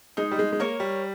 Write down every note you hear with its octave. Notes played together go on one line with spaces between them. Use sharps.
G#3 D#4
G3
G#3
G#3
A#3 A#4 C#5
G3